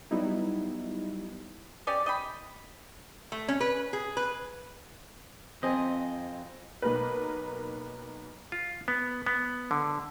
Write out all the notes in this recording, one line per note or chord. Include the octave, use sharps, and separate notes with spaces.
F#3 G3 B3 D#4 E4
C#4 G4 D5 D#5
D#5 G5 B5
A3
C#4
B4
G#4
B4
F2 C4 D#5 G#5
B1 A#3 A#4 B4
F4
B3
B3
D3